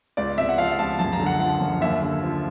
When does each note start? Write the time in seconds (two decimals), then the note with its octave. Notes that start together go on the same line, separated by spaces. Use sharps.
0.17 C#2 D5
0.38 C3 E5
0.49 F#5
0.58 F3 F5
0.79 C#2 A5
0.99 F#2 A5
1.13 A#5
1.20 D3
1.26 F#5
1.40 F3 F#5
1.60 F#2
1.81 D#2 E5
2.02 D3
2.23 F3